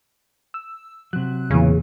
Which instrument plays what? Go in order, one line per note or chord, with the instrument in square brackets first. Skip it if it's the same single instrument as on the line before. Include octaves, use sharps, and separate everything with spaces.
[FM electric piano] E6
[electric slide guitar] C3 F#3 [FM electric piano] F#6
[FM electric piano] E2 A#2 E3 [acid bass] C#3